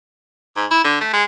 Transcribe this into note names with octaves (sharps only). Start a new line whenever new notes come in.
G#2
E4
D3
A3
G#3